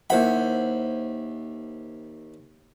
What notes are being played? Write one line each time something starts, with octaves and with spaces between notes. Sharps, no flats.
D#2 E4 C5 F#5 B5